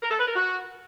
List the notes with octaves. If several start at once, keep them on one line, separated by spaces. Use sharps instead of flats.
A#4
A4
B4
A#4
F#4